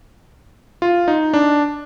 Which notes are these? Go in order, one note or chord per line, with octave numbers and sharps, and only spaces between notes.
F4
D#4
D4